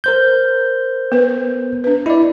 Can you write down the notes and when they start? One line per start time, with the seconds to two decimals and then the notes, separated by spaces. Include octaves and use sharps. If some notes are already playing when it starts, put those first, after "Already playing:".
0.04 A#4 C5 G6
1.12 B3 B4
1.84 D4 B4
2.06 E4 D5 D#5